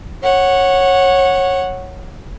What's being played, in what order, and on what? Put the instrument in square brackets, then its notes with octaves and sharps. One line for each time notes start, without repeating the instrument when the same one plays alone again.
[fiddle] C#5 F#5